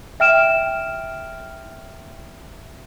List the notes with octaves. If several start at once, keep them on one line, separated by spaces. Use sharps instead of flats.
E5 G5 F6 D7 E7